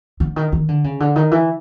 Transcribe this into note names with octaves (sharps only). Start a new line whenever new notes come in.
D3
D#3
D#3
D3
C#3
D3
D#3
E3